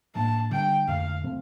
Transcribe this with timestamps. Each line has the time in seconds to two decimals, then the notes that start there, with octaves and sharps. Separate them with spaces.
0.15 A2 F3 A#3 D4 A5
0.51 D3 G3 D4 G5
0.87 F2 D3 A3 F5
1.23 C3 F3 A3 C4